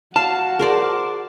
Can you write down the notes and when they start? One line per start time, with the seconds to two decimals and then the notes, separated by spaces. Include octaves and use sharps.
0.16 F#4 F5 A5
0.59 G#4 A#4 C5 D5